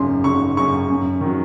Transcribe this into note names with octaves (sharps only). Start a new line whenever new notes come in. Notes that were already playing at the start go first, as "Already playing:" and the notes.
Already playing: G#1 F#2 C#3 C6
G#1 C#6
F#2 C#3 C#6
F#2
D#3 F#3